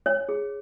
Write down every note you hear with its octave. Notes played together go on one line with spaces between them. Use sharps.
C#5
G#4